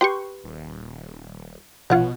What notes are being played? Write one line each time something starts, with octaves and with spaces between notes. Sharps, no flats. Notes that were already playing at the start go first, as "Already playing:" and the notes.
G4 B4 G5 C6 C#6
D#1
A#1 B2 F4 C#5 F#5